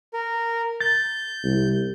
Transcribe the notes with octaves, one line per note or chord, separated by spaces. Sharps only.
A#4
G6 A6
C2